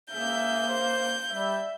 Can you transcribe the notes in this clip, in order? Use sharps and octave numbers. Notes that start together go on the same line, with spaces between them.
C#2 A#3 G#4 E5 G6
C5
G3 E5